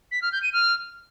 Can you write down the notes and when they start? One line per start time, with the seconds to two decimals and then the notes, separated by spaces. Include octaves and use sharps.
0.11 B6
0.22 F6
0.32 G6
0.43 D#7
0.53 F6